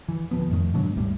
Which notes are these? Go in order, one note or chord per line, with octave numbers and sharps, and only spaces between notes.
E3
D1 F3 B3
F2 A2 D#3
G#2 B2 D3 F#3
G#1 D#2 A2 G3